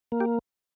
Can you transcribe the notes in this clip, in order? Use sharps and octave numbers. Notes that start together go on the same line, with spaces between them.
A#3
G4